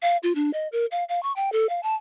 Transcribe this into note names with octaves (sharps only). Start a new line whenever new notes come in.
F5
F4
D4
D#5
A#4
F5
F5
C#6
G5
A4
F5
A5